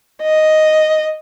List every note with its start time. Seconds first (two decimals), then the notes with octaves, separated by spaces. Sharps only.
0.22 D#5